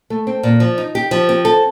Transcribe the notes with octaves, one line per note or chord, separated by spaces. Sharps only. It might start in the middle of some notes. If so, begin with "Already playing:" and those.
A3
C4
A#2
F3
D#4
G4
F3
C4
A4